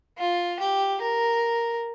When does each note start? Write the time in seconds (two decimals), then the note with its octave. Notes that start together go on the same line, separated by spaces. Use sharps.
0.18 F4
0.60 G4
1.01 A#4